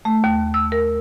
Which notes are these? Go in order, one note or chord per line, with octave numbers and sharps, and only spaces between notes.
A3
D#2
E6
A#4